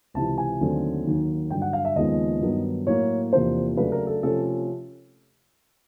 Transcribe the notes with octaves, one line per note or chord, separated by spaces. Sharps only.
C#2 C3 E3 A5
G#5
D#2 D3 F#3 A3 C4
D#2 D#3 F#3 A#3
G2 D3 F#3 G5
F#5
F5
E5
D#2 C#3 F3 G#3 B3 D#5
G2 D#3 F#3 B3 D#4
A2 F#3 A#3 C#5
E2 C3 F3 A#3 D4 C5
C#3 F#3 A3 D4 B4
A#4
A4
C3 F3 A3 C#4 A4